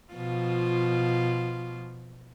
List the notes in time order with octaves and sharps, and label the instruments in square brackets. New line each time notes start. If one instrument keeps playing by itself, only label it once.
[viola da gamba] B2 F3 F4